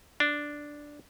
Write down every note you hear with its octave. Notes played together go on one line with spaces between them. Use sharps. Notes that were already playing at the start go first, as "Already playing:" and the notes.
D4